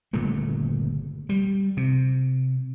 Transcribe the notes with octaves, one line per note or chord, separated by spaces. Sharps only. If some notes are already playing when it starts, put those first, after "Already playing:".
G1 A#2 C#3 A3
G3
C3